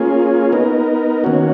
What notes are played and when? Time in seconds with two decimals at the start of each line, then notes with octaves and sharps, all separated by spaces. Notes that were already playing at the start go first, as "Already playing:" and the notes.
Already playing: A#3 C#4 F4 G#4
0.52 B3 D#4 A#4
1.24 D#3 A#3 C#4 F#4